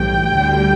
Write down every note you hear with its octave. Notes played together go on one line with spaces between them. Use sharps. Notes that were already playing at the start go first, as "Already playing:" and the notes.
Already playing: B1 A2 E3 G3 G5
D2 D3 G3